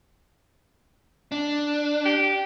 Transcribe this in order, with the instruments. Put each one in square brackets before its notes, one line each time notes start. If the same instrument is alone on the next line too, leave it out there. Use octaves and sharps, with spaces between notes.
[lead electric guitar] D4
[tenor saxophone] G4